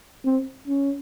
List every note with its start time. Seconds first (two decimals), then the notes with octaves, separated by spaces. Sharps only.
0.25 C4
0.67 C#4